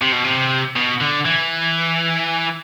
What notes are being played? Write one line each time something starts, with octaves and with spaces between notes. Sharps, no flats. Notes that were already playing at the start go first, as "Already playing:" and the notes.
C3
B2
C3
B2
D3
E3